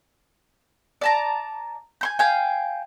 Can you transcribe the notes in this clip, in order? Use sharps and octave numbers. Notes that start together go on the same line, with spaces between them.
D5 A5 A#5
G#5 C6 G6
F5 G5 G#5